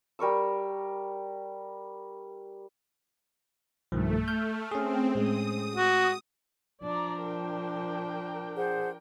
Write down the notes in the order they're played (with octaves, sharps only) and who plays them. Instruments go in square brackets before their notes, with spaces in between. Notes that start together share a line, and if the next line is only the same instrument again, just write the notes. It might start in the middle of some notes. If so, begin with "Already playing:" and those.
[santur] G3 A#4 C#6 E6
[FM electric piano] B1 G2 [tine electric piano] D#3 F3 [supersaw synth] A3
[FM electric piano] F6 [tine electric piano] G6
[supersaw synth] C4 [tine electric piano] C#4 G#4
[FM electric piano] A2 G#3 [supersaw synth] D#6
[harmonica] F#4
[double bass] F3 D4 [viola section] D5 A#5
[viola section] A#4 G5
[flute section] G#4 C5 F#5